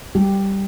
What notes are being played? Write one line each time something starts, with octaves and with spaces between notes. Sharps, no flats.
G3 G4